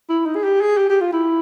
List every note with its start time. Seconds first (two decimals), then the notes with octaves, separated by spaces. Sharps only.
0.09 E4
0.26 D#4
0.36 G#4
0.44 G4
0.61 G#4
0.78 G4
0.90 G4
1.01 F4
1.13 E4